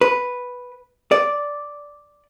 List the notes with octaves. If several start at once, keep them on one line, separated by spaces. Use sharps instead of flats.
B4
D5